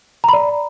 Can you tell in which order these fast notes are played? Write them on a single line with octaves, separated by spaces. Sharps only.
A#5 B5 D5